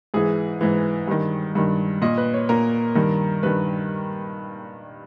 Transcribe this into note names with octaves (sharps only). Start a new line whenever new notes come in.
G#2 E3 G#4
G#2 E3
G2 D#3
G2 D#3
A#2 D#5
B4
C#5
A#2 A#4
G2 D#3
G2 D#3 B4